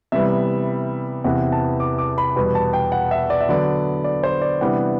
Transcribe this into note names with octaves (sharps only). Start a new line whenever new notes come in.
C3 E3 G3 B3 E5
E2 C3 E3 B3 F#5
A5
D6
D6
B5
E2 B2 G3 B3
A5
G5
F#5
E5
D5
E5
D3 F#3 B3 D5
D5
C5
D5
C3 E3 G3 B3 D4 F#5